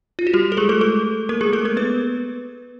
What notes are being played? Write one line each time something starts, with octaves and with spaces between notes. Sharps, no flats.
F4
F#4
G3 G4
A4
G#3 G#4
A3 A4
A3 A4
A#3 A#4
G#3 G#4
A3 A4
A#3 A#4
B3 B4